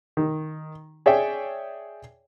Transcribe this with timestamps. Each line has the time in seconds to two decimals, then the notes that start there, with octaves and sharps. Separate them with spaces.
0.17 D#3
1.06 G#4 C#5 D5 E5 G5